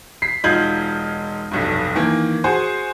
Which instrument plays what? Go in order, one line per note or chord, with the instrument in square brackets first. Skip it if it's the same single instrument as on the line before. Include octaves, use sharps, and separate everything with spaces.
[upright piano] B6 C7
E1 D#4 F4 G6 G#6 F#7
F1 B1 G2
D#3 E3 A#3
F#4 G#4 C5 G#5